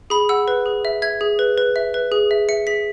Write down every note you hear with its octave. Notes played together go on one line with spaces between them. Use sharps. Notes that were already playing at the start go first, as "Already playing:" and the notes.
G#4 B5
F#5 E6
B4
G#4
E5
E5 G#6
G#4
B4
B4
E5
B4
G#4
E5
E5 C#7
G#4 B6